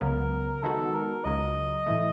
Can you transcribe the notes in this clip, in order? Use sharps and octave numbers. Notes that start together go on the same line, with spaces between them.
C#2 C#3 F#3 B3 A#4
D#3 G#3 B3 D#4 F#4 A4
A#4
C#2 C#3 F#3 D#5
A2 E3 A3